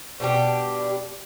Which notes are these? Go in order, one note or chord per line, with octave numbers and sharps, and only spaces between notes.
B2 G3 D4 G4